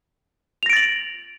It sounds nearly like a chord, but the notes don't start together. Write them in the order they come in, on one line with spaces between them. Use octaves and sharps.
F7 A#6 D7 A6 F#7